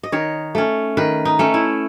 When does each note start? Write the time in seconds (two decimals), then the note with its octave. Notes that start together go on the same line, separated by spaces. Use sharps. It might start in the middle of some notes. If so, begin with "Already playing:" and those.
0.03 D#5
0.12 D#3 C#5
0.55 A3 C#4
0.97 D#3 B4
1.25 D#4
1.39 A3 C#4
1.54 E4